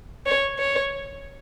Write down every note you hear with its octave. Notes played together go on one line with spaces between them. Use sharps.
C#5
C#5